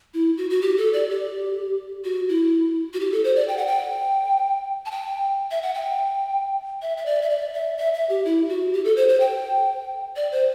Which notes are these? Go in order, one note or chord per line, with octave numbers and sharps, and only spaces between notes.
E4
F#4
F#4
G4
A4
D5
G4
F#4
E4
F#4
G4
A4
C5
D5
G5
F#5
G5
A5
G5
E5
F#5
G5
E5
E5
D5
E5
D5
E5
E5
E5
G4
E4
F#4
G4
A4
C5
C5
G5
D5
C5